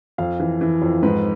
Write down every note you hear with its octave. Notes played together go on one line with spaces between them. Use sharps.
F2 F5
E3
E3
F2
G#2 B4